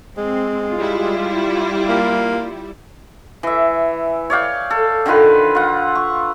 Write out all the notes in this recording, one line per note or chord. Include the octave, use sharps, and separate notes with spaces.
G#3 C4
G3 E4 F4
A#3
E3 E5
C#5 D5 F5 G5
A4
D3 D#3 F4 B4
F4 F#5
C#6